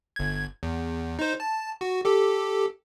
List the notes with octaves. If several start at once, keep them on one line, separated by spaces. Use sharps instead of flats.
G1 G#6
E2
D#4 C5
A5
F#4
G4 A4